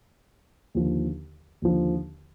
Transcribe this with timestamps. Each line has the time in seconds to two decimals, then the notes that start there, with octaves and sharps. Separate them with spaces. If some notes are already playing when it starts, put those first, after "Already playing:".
0.75 D#2 D3 F3
1.62 D#2 D3 F3